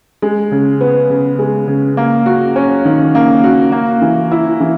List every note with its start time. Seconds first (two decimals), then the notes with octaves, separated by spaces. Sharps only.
0.22 G#3
0.52 C#3
0.81 B3
1.10 C#3
1.39 G#3
1.68 C#3
1.97 A#3
2.26 F#4
2.56 C#4
2.85 D#3
3.15 A#3
3.44 F#4
3.72 A#3
4.02 E3
4.32 E4
4.60 E3